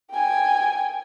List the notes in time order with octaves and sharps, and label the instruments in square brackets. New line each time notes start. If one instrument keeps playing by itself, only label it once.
[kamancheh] G5 G#5